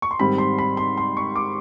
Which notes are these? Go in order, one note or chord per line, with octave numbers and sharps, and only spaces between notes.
C#6
C6
G#2 D#3 G3 C4 B5
C6
B5
C6
C6
C#6
D6